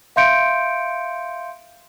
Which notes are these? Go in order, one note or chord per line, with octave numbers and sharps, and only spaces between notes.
E5 F5 C6 G6 C#7 D7